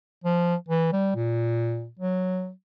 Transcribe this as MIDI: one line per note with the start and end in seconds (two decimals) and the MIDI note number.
0.24 0.56 53
0.69 0.90 52
0.93 1.14 55
1.15 1.88 46
1.99 2.51 54